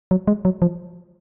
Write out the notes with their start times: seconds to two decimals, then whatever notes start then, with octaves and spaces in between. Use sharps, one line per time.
0.11 F#3
0.27 G#3
0.45 F#3
0.62 F3